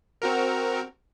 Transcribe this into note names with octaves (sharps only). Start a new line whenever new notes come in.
C4 F#4 A#4